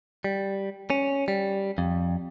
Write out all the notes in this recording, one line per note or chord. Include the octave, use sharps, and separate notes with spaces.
G3
C#4
G3
F2